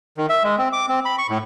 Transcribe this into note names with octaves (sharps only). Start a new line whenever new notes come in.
D#3
E5
G#3
C4
D6
C4
B5
C#6
A2